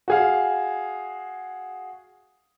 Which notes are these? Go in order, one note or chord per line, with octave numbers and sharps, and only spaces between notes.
F#4 G#4 F5